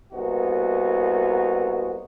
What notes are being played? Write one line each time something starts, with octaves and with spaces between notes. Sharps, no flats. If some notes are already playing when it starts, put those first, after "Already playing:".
C2 A#3 B3 D#4 E4 F#4